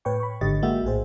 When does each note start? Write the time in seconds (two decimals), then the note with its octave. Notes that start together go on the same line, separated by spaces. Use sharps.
0.05 A2 B4 C#5 G5 C#6
0.20 B5 C#6
0.41 G#1 G#2 D3 G4 D#5 A6
0.62 G#3 A#3 F#4 E5 G5
0.84 A#1 A2 G#4 C5